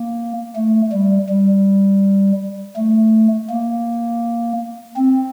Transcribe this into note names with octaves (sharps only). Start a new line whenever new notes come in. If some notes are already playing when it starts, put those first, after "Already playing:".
Already playing: A#3
A3
G3
G3
A3
A#3
C4